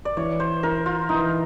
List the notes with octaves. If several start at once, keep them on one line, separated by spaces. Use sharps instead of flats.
D5
E3 C#5
C5
E4 A#4
F4
E3 D#4